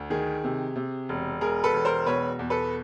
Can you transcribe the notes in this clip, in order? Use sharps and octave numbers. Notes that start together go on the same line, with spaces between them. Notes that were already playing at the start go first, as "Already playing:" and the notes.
Already playing: D2
D#3 G#4
C3
C3
E1
E1 G#4 A#4
A4 B4
E1
A#4 C5
B2 B4 C#5
E2
A4 B4